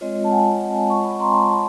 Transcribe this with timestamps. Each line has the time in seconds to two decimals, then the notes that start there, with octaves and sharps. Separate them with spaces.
0.01 G#3 C4 F4 C#5 D#5
0.24 A5
0.31 F#5 G#5
0.90 C#6
1.05 B5 C#6
1.20 A#5 C6
1.43 C6
1.49 A5 B5